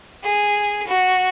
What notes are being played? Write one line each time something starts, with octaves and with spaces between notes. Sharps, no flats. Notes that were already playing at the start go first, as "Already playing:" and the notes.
G#4
F#4